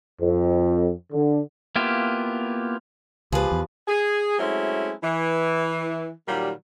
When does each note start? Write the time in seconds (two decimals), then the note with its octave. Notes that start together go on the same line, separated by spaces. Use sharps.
0.21 F2
1.12 D3
1.76 A#3 B3 E4 F4 G4
3.32 C#2 F3 G4 G#4 B4 D5
3.52 E2
3.88 G#4
4.39 F#3 G#3 A3 C4 C#4 E4
5.03 E3
6.28 A#2 D#3 F#3 G3